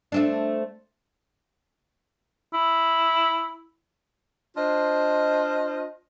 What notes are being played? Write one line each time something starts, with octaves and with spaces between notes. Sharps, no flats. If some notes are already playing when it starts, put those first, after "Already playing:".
A3 C4 D4
E4
D4 F4 C5 D#5